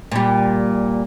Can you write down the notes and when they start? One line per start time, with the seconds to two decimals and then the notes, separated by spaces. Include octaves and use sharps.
0.11 A#2 G3